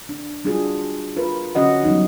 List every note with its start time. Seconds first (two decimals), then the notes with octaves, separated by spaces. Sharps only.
0.09 D4
0.45 G3 D4 F4 F#4 G#4
1.16 F4 A#4 B4
1.55 D3 C#4 F#4 D#5 F#5
1.84 F#3 G3 B3 D#4